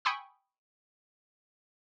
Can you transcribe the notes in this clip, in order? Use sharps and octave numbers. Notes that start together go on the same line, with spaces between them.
G5 G#5 B5 C#6 D#6 E6